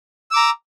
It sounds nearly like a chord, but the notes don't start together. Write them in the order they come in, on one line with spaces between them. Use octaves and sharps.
E6 D6 A#5